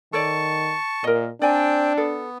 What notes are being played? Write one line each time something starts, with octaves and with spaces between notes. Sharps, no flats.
D#3 A4 C#5 D5 A5 C#6
A#2 A#4 D#5
C4 D4 D5 G5 G#5
B3 A4